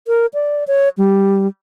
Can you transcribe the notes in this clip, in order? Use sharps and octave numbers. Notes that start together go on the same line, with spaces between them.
A#4
D5
C#5
G3